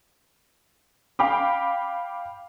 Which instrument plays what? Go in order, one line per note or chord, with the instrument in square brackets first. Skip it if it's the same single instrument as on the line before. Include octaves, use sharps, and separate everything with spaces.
[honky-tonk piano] F5 G5 B5 D6